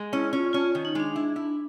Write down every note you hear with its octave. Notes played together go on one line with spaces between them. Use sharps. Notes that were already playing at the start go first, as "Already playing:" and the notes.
Already playing: G#3
C#4 E4
C#4 F4
C#4 F4
D#3
D#4
G#3 D4
E4
E4